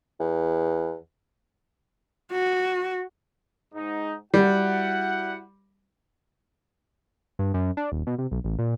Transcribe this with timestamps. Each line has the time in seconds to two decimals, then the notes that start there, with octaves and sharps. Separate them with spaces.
0.20 E2
2.32 F#4
3.75 G#2 D#4
4.34 G3 E4 F#4 F#5
7.39 G2
7.54 F#2
7.77 D4
7.92 D#1
8.07 B2
8.18 C3
8.31 B1
8.44 A1
8.59 A#2